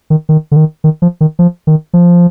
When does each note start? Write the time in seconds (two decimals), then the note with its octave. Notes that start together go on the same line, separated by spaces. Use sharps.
0.10 D#3
0.29 D#3
0.52 D3
0.56 D#3
0.84 D#3
1.02 F3
1.21 D#3
1.39 F3
1.67 D#3
1.94 F3